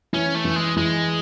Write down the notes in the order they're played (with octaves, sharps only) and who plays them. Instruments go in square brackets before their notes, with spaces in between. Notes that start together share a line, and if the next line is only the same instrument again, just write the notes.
[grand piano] E3 [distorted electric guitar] C#4
[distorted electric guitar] A3
[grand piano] E3
[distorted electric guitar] G#3
[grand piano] E3 [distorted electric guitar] G#3